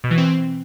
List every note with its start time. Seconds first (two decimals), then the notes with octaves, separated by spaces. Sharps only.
0.04 B2
0.11 E3
0.18 C4